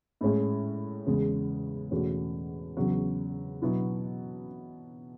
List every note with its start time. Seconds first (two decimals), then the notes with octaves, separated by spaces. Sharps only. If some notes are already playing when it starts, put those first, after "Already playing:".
0.21 A2 G#3 C#4 G#4
1.06 E2 C#3 G#3
1.91 E2 B2 A3 C#4 F#4
2.76 E2 C#3 F#3 B3
3.62 B2 F#3 B3 E4